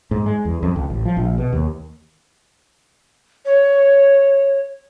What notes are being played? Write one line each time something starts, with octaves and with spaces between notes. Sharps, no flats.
G#2
G#3
E2
F2
C#2
A1
F3
A#1
B2
D#2
C#5